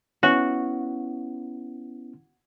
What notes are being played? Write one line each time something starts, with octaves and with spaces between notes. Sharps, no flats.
B3 C#4 E4 F#4